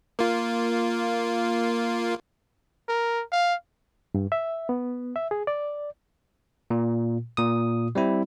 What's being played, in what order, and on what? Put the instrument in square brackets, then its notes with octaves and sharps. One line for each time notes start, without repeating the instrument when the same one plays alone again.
[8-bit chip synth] A#3 F4
[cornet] A#4
F5
[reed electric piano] G2
E5
B3
E5
G#4
D5
[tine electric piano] A#2
A#2 D#6
G3 C4 E4